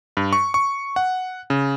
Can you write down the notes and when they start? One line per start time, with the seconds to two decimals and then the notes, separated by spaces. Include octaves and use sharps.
0.17 G2
0.33 C#6
0.54 C#6
0.96 F#5
1.50 C#3